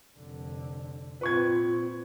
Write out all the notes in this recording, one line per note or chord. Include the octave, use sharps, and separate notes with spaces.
F1 D3
A#2 C4 F4 B4 C#6 G#6